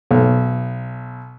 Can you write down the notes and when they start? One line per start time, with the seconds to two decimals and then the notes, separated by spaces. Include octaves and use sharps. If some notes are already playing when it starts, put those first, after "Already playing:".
0.11 B1